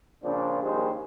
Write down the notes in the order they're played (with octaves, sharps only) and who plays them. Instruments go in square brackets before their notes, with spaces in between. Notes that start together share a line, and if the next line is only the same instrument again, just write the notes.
[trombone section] A#2 C#3 F3 C4 D4
A#1 D#2 G3 G#3 G#4 C5